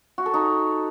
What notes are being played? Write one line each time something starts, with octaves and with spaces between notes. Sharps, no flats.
F#4
A4
D#4